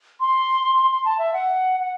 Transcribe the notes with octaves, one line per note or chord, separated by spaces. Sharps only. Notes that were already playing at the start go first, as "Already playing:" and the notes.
C6
C6
C6
A5
E5
F#5
F#5